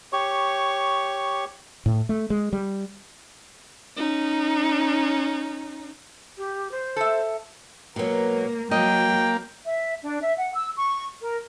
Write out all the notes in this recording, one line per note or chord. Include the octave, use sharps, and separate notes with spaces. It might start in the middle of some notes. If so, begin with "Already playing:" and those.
G4 C#5 C#6
A2
A3
G#3
G3
C#4 D#4
G4
C5
A4 E5
B2 F#3 A#3 A#4
F#3 A#3 D#5 G5
E5
D4
E5
F#5
E6
C#6
A#4